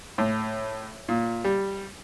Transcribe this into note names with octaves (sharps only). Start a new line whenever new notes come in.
A2
A#2
G3